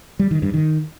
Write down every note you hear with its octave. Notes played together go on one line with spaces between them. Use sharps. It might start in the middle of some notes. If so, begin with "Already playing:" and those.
G3
D#3
G2
D#3